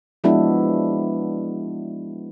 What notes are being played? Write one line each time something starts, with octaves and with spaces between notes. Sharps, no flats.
F3 G#3 B3 D4 E4 F#4